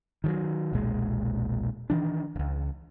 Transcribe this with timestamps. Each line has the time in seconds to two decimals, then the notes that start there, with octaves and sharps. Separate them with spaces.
0.24 D#3 F3 F#3
0.73 E1 B1 A#2 G#3
1.90 D#3 E3 D4
2.36 D1 C#2